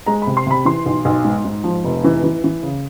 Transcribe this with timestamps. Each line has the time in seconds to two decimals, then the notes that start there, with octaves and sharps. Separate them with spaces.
0.06 G#3 A#5
0.22 B5
0.27 C3
0.37 C6
0.47 C3 B5
0.65 E3 C6
0.86 B1
1.05 B1
1.24 G#2
1.45 G#2
1.64 F3
1.84 F1
2.04 E3
2.23 E3
2.44 E3
2.63 C#3